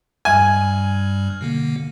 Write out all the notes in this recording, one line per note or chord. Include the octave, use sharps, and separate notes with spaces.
G2 G3 G#5 F6
B2 D3 A#3